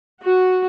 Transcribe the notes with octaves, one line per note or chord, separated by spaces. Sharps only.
F#4